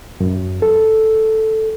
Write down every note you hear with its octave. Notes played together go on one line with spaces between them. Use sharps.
F#2
A4